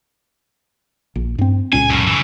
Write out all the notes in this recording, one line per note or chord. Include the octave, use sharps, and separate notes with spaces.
A#1
G2 C4
C#2 A#2 C#4 G#5
F#2 A2
C#3 E3